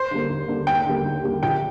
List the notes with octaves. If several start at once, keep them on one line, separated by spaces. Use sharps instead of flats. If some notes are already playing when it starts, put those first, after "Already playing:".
Already playing: C5
D3 G3 A#3
D#2
D3 G3 A#3
D#2 G5
D3 G3 A#3
D#2
D3 G3 A#3
A#1 G5